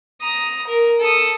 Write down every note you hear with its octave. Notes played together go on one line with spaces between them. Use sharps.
A#5 D#6
A#4
A4 D#6